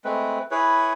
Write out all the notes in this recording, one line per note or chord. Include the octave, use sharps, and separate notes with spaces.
G#3 A3 C4 B4
E4 G#4 B4 C#5